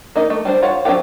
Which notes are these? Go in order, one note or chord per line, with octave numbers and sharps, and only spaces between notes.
A#3 D#4 D#5
A3
G3 D4 C5
F4 C#5 F#5
F#3 C4 D4 F4 G4